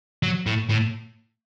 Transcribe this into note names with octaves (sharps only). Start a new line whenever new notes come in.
F#3
A2
A2